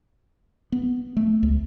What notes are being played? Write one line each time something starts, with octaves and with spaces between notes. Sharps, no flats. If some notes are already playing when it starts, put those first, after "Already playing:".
B3
A3
C#2